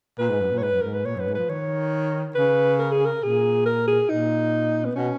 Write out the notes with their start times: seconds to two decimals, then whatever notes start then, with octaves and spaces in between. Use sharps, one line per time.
0.19 A#2 B4
0.30 G#2
0.41 F#2
0.52 A#2
0.58 C#5
0.62 G#2 B4
0.72 F#2
0.82 G#2 A#4
0.94 B4
1.05 A#2 C#5
1.16 F#2 B4
1.28 G#2
1.35 F3 B4
1.49 D#3 C#5
2.35 C#3 B4
2.79 A#4
2.92 G#4
3.05 A#4
3.22 A#2 G#4
3.66 A#4
3.87 G#4
4.09 A#2 D#4
4.85 B3
4.95 B2 C#4